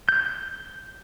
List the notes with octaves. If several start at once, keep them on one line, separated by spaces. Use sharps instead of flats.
G6